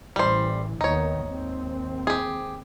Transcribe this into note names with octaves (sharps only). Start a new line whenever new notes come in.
A1 E3 G3 C5
D#2 D#3 B3 D#4 C#5
D#2 G#2 C4
G4 G#4